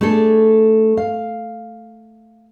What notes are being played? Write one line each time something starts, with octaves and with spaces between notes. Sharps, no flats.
A3 D4 G#4 A4
F5